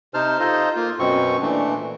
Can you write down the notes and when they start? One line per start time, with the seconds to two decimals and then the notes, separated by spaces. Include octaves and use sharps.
0.14 C3 D#4 C5 A5 F6
0.40 D#4 F4 A4 C5 D#5
0.76 A#3 F4
0.99 F#2 B2 C4 C#6
1.42 A#2 E3 A3 D4